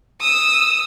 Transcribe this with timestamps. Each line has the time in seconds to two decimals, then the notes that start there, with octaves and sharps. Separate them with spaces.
0.21 D#6 E6